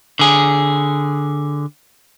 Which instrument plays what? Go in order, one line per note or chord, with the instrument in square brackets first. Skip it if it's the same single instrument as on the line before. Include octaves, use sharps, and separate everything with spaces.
[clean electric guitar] D3 G#4